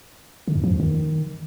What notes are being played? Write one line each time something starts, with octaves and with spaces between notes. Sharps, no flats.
D3
F2
F3
E2
D#3